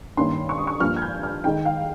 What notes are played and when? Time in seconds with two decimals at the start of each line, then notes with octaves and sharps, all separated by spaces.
0.17 G2 D#3 A#3 C#4 C6
0.49 C#6
0.58 D#6
0.67 C#6
0.80 G2 F3 A#3 F6
0.96 G#6
1.02 G6
1.23 F6
1.44 D#3 G#3 D#4 G5
1.65 F5